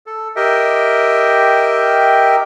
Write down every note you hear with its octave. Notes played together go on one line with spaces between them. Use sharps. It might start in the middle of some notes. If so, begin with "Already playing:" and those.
A4
G4 A#4 D#5 E5 G5